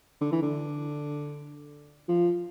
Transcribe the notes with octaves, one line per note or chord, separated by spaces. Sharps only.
D3
E3
D3
F3